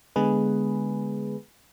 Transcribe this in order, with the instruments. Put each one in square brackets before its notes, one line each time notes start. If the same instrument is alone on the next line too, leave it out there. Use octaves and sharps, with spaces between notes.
[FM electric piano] D3 G#3 B3 G#4 B4